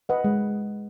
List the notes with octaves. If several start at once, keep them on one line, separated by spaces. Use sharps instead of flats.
B4 D#5 F#5
G#3